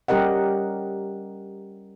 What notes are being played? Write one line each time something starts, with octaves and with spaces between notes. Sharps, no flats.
G3 C#4 G4 A#4 D#5 F#5